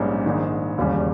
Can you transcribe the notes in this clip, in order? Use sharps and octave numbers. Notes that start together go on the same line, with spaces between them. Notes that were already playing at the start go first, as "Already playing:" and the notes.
Already playing: A#1 G#2 G3 A#3 C#4
A#1 G#2 D#3
E1 D#2 C#3 G3